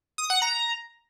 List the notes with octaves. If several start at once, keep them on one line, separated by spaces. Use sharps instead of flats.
D#6
F#5
A#5